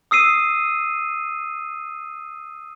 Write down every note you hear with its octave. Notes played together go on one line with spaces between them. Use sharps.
D#6 E6 C7 D#7